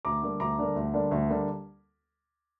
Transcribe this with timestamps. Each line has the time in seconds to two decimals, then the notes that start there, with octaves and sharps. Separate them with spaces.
0.05 D2 A#5 D6
0.22 D3 G3 A#3
0.40 D2 A#5 D6
0.58 D3 G3 A#3
0.76 D2
0.94 D3 G3 A#3
1.11 D2
1.29 D3 G3 A#3